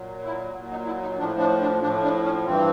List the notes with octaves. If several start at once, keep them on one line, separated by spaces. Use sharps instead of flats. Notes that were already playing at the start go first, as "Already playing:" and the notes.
Already playing: A#2 F#3
E4
A#2 F#3
D#4
E4
D#4
A2 F3 D4
D4
D4
A2 F3 D4
D4
C#4
G2 E3 C4